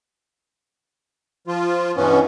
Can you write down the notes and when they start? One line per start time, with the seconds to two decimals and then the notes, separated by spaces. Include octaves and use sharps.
1.47 F3 F4
1.96 G2 B2 E3 B3 C#4